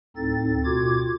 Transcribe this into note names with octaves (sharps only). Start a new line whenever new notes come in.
D2 A2 C4 D#4 A4 A6
B2 F4 F#4 D6 G#6